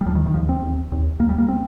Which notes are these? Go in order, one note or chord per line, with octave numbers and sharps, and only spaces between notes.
G3
D#2 F3
D#3
D#3
D#2 F3
C4
D#2
D#2
D#2 A#3
G3
A#3
C4